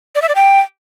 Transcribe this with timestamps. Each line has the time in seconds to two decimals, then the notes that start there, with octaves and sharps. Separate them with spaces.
0.15 D5
0.22 E5
0.29 D5
0.35 G5